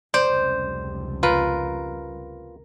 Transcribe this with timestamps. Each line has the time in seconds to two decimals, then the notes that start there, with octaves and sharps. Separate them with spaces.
0.14 F1 C#2 G3 C5 D5
1.23 F4 A#4 B4